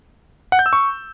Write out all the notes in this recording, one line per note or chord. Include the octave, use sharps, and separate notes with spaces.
F#5
G6
E6
C#6